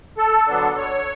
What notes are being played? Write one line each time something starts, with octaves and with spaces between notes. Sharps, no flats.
A4
D3 F#3 B3 D4
C#5